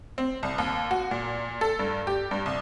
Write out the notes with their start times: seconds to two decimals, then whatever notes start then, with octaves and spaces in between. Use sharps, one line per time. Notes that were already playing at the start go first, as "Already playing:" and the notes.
0.18 C4
0.43 C2
0.58 D#2
0.91 F#4
1.11 A#2
1.61 A4
1.79 G2
2.07 G4
2.31 G2
2.46 C2